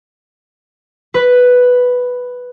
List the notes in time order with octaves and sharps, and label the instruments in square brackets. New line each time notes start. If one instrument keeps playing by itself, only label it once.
[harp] B4